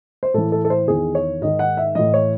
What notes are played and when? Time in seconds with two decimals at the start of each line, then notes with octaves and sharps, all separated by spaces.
0.23 C5
0.34 A2 E3 A4
0.52 A4
0.65 A4
0.70 C5
0.88 E2 D#3 G#4
1.15 C#5
1.42 G#2 D#3 D#5
1.59 F#5
1.77 E5
1.95 A2 E3 D#5
2.14 C#5